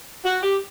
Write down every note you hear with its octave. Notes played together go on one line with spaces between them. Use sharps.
F#4
G4